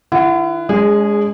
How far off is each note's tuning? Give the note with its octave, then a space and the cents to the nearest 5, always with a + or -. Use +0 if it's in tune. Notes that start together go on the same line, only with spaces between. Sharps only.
D#3 +0 E4 +40 F#5 +0
G#3 +0 C#4 +45 G#4 -15